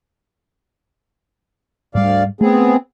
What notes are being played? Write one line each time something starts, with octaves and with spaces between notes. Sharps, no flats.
D2 G#2 G3 D5 F5
A3 B3 C4 G#4